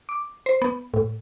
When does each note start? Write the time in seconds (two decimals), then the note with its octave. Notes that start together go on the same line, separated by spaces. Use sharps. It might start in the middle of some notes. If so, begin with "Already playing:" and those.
0.09 D6
0.46 C5
0.62 B3
0.94 A2